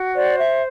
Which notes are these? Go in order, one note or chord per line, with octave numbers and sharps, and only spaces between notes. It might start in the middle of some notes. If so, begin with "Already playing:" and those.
Already playing: F#4
C5 D5
E5